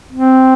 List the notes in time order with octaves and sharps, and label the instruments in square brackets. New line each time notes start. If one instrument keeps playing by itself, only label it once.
[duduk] C4